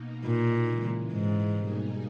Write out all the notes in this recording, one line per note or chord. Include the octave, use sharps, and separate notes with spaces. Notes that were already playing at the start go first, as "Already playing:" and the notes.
Already playing: B2 A#3 D#4
A#2
C#3 E3 G#3
G#2
B2 G3 A#3 D#4 G#4